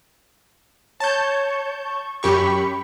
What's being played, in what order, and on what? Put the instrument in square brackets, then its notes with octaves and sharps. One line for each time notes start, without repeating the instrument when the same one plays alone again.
[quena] C#5 [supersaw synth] A5 G6
[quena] C#6
[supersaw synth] F#2 G4 C#6 [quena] B5